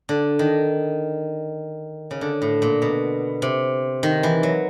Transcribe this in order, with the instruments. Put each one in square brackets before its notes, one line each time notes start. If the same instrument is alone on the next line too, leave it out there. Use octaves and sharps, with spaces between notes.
[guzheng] D3
D#3
C#3
D3
A2
A#2
B2
C3
D#3
E3
F#3